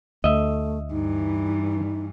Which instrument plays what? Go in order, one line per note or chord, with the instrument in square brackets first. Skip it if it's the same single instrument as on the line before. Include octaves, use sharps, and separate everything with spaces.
[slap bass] D2 [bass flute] A3 [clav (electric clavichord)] D#5 E5
[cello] G2 E3 [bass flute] D#4